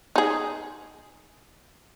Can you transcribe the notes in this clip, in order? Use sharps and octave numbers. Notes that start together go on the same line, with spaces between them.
D#4 G#4